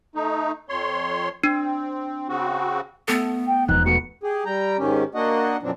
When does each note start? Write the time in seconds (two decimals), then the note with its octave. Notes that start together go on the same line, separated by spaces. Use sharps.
0.15 A3 D#4
0.69 F2 C#5 C6
1.44 C4 D4
2.29 C#3 C4 F#4
3.08 A3 B3 A4
3.47 G5
3.68 E1 F3 B3 D#4 F#6
3.86 A3 B3 F#4 C#7
4.24 G4 G#4
4.46 G3 G5 A#5
4.79 G#2 D#3 C#4 G4
5.15 A#3 D4 F#4 D#5 F#5
5.63 F#2 B2 F3 F#3 C4 D4